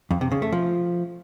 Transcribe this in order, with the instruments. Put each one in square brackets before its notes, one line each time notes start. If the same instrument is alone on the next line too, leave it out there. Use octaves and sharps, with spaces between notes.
[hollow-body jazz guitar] F2
C3
C#3
A3
F3